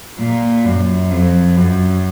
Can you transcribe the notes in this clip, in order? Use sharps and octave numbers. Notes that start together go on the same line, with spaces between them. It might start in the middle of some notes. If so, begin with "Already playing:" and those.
A#2
F#2
F2
F#2